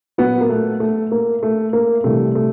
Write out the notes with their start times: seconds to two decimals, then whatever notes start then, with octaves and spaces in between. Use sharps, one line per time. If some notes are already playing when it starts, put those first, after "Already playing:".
0.18 A#2 F#3 B3
0.41 A#3
0.49 A3
0.80 A3
1.11 A#3
1.43 A3
1.73 A#3
2.04 C3 E3 G3 A3
2.35 A3